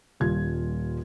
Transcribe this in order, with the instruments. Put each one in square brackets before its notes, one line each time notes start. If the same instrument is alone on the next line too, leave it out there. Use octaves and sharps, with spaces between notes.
[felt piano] D#1 G3 F4 G#6